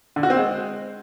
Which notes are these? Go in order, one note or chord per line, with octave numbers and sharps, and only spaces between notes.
D3
F#4
C4
G#3